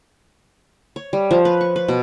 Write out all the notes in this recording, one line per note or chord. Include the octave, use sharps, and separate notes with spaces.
C#5
G3
F3
B4
C#6
B4
B2